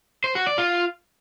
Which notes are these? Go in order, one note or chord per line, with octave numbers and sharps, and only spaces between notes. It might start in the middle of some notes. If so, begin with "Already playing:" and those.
C5
F#4
D5
F4